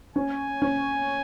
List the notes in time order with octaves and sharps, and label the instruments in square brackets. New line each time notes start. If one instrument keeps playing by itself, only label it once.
[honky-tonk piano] C#4 [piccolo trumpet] G#5
[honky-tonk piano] C#4